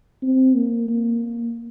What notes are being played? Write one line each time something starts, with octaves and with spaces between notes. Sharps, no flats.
C4
A#3
A#3